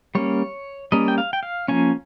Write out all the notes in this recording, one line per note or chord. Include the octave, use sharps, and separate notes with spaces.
G3 A#3 C#4 C#5
G3 A#3 C#4 D#5
G5
F5
G5
F5
F3 A#3 C#4 G#5